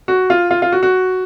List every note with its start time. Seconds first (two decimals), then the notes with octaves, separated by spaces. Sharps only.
0.08 F#4
0.30 F4
0.51 F4
0.62 F4
0.72 F#4
0.83 F#4